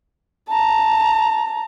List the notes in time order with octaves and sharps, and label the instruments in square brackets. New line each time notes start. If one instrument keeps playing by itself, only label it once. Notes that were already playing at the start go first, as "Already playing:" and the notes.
[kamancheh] A5 A#5